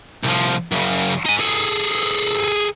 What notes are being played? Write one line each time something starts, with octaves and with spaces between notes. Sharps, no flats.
C2 F3
F#2 C#3
D#4 G#5
G#4 A4